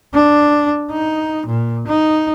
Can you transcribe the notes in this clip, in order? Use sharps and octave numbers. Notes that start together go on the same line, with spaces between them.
D4
D#4
A#2
D#4